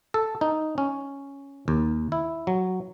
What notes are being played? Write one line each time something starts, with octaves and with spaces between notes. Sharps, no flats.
A4
D#4
C#4
D#2
E4
F#3